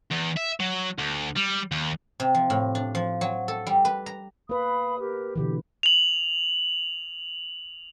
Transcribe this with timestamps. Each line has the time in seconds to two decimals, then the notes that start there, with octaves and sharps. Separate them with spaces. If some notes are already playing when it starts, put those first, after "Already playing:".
0.11 E2
0.37 E5
0.60 F#3
0.98 D2
1.36 G3
1.72 D#2
2.20 C3
2.35 F3
2.50 A2
2.75 D4
2.95 F3
3.21 F#3
3.48 A4
3.67 G3
3.85 B4
4.06 A#5
4.49 A#3 B4 F5 B5 D#6
4.98 G4 A#4
5.36 B2 D3 E3 G4
5.83 F7 F#7